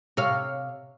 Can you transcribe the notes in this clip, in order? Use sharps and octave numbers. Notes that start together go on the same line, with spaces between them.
C3 C#5 F5